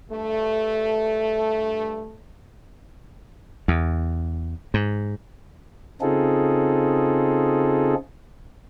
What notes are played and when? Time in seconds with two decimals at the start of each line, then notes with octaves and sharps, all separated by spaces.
0.11 G2 A3
3.68 E2
4.74 G#2
6.01 C#3 C4 D#4 F4 G#4 A4